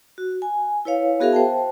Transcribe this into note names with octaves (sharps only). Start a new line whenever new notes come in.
F#4
G#5
E4 B4 C#5 F5
B3 F#4 G#4 A#4 E5 F5
C5 G5 A5